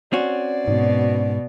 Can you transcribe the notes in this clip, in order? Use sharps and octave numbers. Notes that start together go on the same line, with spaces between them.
C4 C#4 F#4 D5
G#2 B2